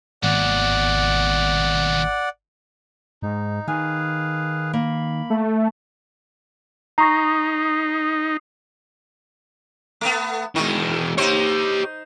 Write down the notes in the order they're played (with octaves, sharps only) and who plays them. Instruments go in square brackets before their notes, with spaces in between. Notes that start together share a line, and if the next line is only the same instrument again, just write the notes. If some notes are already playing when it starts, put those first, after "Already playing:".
[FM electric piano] G#1 [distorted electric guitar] D#2 B2 [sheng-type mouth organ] D5 F#5
[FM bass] G#2 [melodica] D#4
[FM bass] D#3 [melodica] G#4 B4 F5 [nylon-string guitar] G#5
[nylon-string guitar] A#3 [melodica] B5
[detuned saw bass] A3
[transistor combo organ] D#4 [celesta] A#5 C#6 A#6 [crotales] D#6 C7
[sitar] A3 B3
[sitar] D#3 [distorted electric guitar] E3 G#3
[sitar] D#4 C5 [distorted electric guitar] G4 C#5